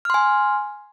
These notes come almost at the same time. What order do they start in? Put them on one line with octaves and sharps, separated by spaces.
F6 C6 G#5